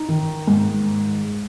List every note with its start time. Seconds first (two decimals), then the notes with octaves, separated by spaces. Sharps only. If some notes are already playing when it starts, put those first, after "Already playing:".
Already playing: D#4
0.09 D#3
0.47 G#2